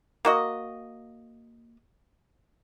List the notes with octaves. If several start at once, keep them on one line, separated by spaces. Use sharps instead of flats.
A#3 F#4 D#5